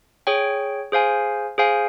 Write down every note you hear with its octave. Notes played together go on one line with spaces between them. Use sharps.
G#4 C#5 G5
G#4 C5 F5 G#5
G#4 C5 F5 G#5